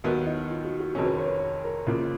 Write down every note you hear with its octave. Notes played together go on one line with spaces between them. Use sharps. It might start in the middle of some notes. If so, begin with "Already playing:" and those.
D#2 D#3 F#3 B3
D#4
F4
F#4
F#4
F1 F2 D#3 F#3 C#4 G#4
B4
A#4
C#5
B4
A#4
C#2 C#3 F3 A#3 F4